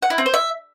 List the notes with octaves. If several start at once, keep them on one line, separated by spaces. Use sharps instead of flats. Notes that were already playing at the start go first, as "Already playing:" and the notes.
F#5
E4
C4
C5
E5